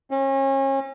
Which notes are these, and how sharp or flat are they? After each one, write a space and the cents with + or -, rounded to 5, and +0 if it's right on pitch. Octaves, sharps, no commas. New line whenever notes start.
C#4 -35